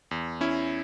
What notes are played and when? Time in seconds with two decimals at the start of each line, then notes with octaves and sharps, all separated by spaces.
0.11 E2
0.41 C#4 E4